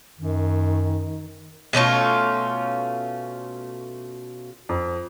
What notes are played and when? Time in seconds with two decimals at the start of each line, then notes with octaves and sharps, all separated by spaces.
0.19 F#2 D#3
1.73 B2 A3 C#4 F4
4.69 F2